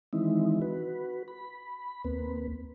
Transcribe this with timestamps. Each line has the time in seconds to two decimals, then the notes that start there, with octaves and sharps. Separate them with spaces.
0.13 D#3 E3 G#3 C4 D#4 E4
0.62 F#4 B4
1.28 B5
2.04 D#2 A#3 C4 B4